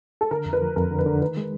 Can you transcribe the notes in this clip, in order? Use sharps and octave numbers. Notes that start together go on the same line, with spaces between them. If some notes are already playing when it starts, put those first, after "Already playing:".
A4
D3 A#4
F2
B4
F3
F2 A#4
D3
B4
D3
D#3 B4
G#3